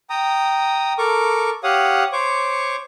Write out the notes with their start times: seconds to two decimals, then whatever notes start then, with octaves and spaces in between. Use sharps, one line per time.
0.10 G5 A#5 D#6
0.98 A4 A#4 C#6 D6
1.63 G4 C#5 F5 F#5 D#6
2.12 C5 C#5 C#6 D6